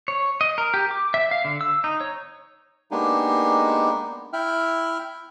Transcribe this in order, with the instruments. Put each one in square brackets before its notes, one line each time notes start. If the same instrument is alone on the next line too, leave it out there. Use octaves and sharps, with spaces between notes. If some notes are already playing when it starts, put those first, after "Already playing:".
[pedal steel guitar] C#5
D#5
A#4
G4
D6
E5
F5
D3
E6
D#4
C#5
[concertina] G#3 A#3 B3 D4 D#4 G4
E4 E5 G5 F6